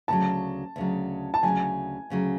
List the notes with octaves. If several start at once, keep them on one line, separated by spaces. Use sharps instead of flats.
D2 C#3 F#3 A5
D2 C#3 F#3
A5
D2 C#3 F#3 G#5
D2 C#3 F#3